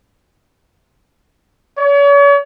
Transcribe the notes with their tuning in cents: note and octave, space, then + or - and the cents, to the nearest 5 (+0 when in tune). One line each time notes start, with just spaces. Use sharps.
C#5 +40